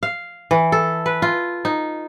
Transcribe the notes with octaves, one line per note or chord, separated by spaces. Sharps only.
F5
E3
A4
B4
F4
D#4